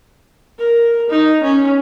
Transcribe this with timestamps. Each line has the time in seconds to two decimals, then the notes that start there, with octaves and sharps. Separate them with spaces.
0.59 A#4
1.09 D#4
1.43 C#4